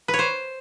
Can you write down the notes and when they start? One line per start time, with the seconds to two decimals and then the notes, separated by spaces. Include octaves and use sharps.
0.08 B4
0.14 C#5
0.19 C5